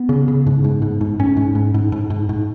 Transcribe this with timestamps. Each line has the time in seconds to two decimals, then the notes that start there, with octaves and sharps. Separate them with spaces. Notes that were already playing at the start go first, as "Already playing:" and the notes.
Already playing: B3
0.09 C#3
0.28 C#3
0.47 G#2
0.64 G#2
0.82 G#2
1.01 G#2
1.19 G#2 C#4
1.37 G#2
1.55 G#2
1.74 G#2
1.92 G#2
2.10 G#2
2.29 G#2